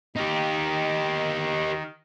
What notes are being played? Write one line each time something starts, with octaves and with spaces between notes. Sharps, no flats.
D#3 D#4 G4